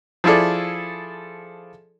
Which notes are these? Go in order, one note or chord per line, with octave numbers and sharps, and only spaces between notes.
F3 E4 G#4 A4 D5